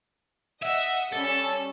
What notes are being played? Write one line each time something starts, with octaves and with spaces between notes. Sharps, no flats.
D#5 E5 F#5
G3 C#4 A4